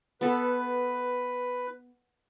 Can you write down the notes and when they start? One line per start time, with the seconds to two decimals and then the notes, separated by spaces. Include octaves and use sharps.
0.21 B3 A4 B4